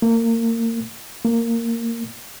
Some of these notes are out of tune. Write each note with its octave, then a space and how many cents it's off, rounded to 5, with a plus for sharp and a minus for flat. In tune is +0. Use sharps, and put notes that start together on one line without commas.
A#3 -30
A#3 -15